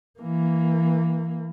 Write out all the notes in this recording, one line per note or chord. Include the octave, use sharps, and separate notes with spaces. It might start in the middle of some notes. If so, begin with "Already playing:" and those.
E3 A#3